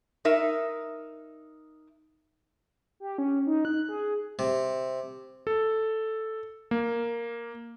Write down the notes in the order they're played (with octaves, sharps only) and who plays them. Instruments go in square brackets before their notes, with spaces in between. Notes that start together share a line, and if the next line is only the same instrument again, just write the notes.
[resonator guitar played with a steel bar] D#4 A#4 E5
[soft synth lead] G4
C#4
D#4
F#6
G#4
[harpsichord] C3
[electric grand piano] A4
A#3